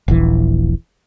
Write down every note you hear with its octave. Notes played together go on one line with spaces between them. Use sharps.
D#1 A#1 E3